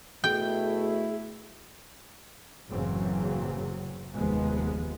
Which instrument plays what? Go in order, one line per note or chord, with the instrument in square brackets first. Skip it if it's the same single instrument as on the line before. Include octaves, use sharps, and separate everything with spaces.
[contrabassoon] B2 [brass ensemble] A3 E4 [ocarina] G#4 [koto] G5
[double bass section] F#1 A2 C#3 E3 F#3 C4
F1 D#2 F3 G#3 B3